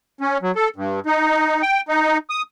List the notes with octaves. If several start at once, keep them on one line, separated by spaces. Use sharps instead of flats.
C#4
F#3
A4
G2
D#4
G5
D#4
D#6